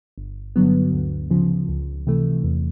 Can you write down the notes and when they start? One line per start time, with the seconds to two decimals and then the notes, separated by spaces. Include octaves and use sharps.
0.18 G1
0.56 G2 D3 F#3 B3
0.93 D2
1.31 C#3 F3
1.69 C#2
2.07 C3 E3 A3
2.44 E2